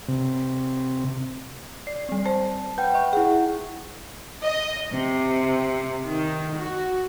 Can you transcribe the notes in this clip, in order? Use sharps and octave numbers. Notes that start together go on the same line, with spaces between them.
C3
D5 C7
G3 C4
C5 A5
B4 F#5 G5 G6
E5 C#6
E4 G#4 F#5
D#5
C3
D#3
F#4